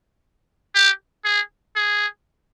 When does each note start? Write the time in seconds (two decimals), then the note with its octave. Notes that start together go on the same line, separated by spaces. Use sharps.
0.75 G4
1.25 G#4
1.76 G#4